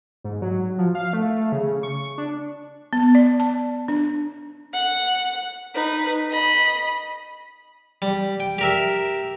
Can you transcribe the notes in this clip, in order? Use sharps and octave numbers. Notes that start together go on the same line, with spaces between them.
G#2
F#3
F3
F5
A3
C#3
C#6
D4
B3
D5
A5
D4
F#5
D#4 B4
D#5 B5
G3
G5
G4 A#4 E5